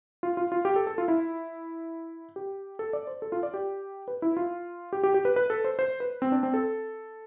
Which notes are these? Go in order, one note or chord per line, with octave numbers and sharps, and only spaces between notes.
F4
F4
F4
G4
A4
A4
F4
E4
G4
A4
D5
C5
A4
F4
D5
G4
B4
E4
F4
G4
G4
G4
B4
B4
A4
C5
C5
B4
C4
D4
C4
A4